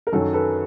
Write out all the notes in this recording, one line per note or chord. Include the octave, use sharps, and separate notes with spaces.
A#4
F#2 D#3 F#3 A4
A4 B4